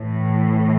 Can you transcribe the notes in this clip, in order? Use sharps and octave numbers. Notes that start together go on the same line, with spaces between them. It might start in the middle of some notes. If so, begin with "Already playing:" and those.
Already playing: A2 E3